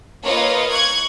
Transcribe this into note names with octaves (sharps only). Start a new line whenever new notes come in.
A#3 F4 B4 C#5 D#5
C#6 F#6 G#6